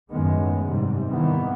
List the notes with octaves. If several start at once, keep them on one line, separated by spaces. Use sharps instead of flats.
F#2 A2 D#3 G#3 B3
G#2 C3 G3
C3 D#3 E3 G3 A#3 B3